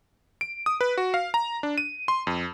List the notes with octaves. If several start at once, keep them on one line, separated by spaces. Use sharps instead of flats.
D7
D#6
B4
F#4
F5
A#5
D4
D#7
C6
F2